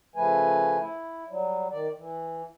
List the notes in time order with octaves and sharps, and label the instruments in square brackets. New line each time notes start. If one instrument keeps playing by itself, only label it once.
[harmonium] C#3 F3 A3 B4 G#5
E4
F#3 G3
D#3 D5
E3